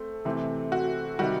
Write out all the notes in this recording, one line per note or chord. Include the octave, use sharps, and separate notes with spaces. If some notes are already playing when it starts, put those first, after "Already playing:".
Already playing: A3 C4
C3 E3 A3 C4
F#4
C3 D#3 G3 F#4